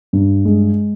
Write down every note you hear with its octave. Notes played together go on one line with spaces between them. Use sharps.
G2
G#3